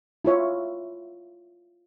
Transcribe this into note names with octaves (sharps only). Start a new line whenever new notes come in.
E4 F4 C#5 E5